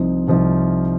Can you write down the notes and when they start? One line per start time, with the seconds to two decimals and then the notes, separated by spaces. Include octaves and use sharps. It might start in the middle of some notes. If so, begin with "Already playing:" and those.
Already playing: C2 C3 F3 C4 D#4
0.28 C2 C3 F3 C4 D#4